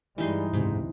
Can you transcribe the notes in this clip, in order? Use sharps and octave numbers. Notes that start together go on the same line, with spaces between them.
G2 E3 G3 G#3 D#4 C6
F#1 D2 G#2 C3